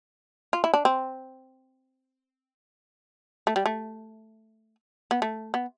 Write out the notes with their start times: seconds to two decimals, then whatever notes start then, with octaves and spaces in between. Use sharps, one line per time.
0.53 F4
0.64 E4
0.74 D4
0.85 C4
3.47 A3
3.56 G3
3.66 A3
5.11 B3
5.22 A3
5.54 B3